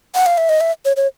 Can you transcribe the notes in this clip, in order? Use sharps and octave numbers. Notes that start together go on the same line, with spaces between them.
F#5
F5
E5
D#5
E5
C#5
C#5